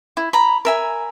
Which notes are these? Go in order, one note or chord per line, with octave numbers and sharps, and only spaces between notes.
E4
A#5 B5
A#4 E5 G#5